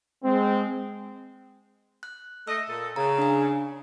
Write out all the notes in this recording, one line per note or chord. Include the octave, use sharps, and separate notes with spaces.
G#3 C4
F#6
A3 D#5 E6
A#2 A4
C#3 A#5
D4 G#5